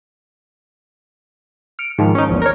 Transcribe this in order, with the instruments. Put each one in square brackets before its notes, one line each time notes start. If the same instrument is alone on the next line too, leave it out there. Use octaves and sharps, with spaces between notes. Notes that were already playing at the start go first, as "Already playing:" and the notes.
[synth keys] F6 C#7 D7
G#2 D#3 F3
C#4 D#4
A#1 E2
A#4 C#5